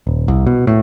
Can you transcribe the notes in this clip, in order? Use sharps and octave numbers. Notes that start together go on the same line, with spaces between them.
D#1
C2
B2
A2